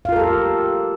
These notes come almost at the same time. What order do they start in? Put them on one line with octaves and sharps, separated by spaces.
F5 F4 A#4 A4 G4